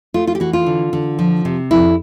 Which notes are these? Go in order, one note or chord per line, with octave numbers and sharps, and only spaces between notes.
A3 F4
F4
G4
E3 F#4
F4
D3
D3
F3
C3
F2 E4